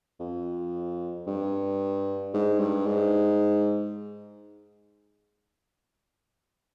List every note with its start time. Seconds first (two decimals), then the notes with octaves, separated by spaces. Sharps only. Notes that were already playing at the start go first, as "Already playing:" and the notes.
0.20 F2
1.27 G2
2.34 G#2
2.59 G2
2.86 G#2